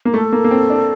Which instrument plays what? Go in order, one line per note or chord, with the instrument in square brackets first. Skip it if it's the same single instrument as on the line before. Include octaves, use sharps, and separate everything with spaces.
[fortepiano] A#3
[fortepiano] A3 [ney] A4
[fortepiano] A#3
A#3
C4
D4